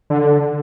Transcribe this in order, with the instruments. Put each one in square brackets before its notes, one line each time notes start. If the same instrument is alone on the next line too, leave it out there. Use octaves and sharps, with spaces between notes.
[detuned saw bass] D3